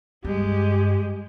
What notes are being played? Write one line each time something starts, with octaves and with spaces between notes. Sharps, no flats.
G2 G#3 G4